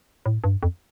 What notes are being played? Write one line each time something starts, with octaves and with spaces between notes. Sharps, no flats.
A2
G2
F2